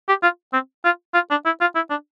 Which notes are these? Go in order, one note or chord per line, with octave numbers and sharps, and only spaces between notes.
G4
F4
C4
F4
F4
D4
E4
F4
E4
D4